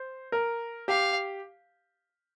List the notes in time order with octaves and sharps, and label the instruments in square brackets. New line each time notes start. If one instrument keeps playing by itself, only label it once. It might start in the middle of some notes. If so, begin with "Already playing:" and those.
Already playing: [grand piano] C5
A#4
[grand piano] G4 [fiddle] F5